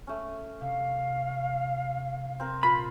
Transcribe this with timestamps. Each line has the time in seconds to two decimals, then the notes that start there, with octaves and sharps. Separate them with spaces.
0.07 A3 C#4
0.61 C3 F5
2.40 C4 A#4
2.63 A#2 F4 A#4 B5 C6